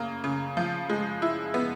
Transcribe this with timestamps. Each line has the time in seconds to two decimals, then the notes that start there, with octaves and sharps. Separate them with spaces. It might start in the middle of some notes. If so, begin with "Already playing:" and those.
Already playing: C#3 A#3
0.24 C#3
0.57 F3
0.90 G#3
1.22 E4
1.54 B3